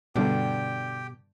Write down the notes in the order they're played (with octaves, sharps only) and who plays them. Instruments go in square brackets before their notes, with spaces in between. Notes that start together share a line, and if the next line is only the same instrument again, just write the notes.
[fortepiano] G2 D3 [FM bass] B2 [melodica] G4 G5